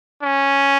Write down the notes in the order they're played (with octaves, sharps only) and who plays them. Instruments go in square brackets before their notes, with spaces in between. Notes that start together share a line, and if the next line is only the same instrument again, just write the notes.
[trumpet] C#4